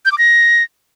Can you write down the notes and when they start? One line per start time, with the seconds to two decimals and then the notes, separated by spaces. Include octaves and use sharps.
0.05 G6
0.12 D6
0.18 A#6